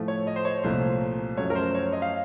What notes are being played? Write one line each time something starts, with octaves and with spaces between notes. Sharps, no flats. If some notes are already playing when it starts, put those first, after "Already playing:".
Already playing: A2 F3 A3
C#5
D#5
C5
C#5
C2 A#2 F3 A3 C5
F#2 F3 A3 C#5
A#4
C5
C#5
D#5
F5